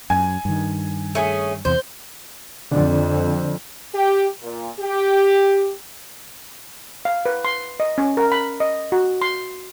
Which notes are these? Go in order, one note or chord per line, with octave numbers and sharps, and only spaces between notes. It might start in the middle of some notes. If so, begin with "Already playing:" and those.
F#2 G#5
G2 D#3
A3 C#4 G#4
E2 C3 C5
F2 D3 D4 D5
G4
A#2
G4
F5
B4
C6
D#5
C#4
A#4
B5
D#5
F#4
C6